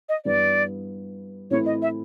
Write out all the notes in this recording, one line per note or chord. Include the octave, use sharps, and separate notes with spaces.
D#5
G2 E3 G3 B3 D5
A2 E3 A3 C4 E4 C#5
D#5
E5